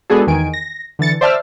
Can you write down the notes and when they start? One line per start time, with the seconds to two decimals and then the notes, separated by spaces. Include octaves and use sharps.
0.10 G#3 B3 D4 F#4 G#4 A4
0.27 E2 D#3 G#5 D7
0.54 A#6
0.99 D3 E3 A6 C#7
1.21 C5 D5 E5 A5 E6 F6